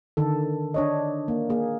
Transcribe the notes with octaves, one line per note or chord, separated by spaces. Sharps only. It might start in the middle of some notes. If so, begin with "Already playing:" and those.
D3 D#3 A4
D4 C#5 D#5
A#3
A#3 G#4